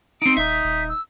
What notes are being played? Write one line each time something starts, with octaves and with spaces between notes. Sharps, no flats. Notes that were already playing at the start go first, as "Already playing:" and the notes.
C4 D#4 D7
D#1 D#4 E5 B6
D#1
E6